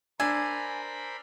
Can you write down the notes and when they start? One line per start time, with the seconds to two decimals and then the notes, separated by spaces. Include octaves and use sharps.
0.20 D4 A#4 C5 G#5 B5 E6